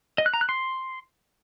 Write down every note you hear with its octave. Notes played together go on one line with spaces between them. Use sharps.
D#5
F#6
A#5
F#6
C6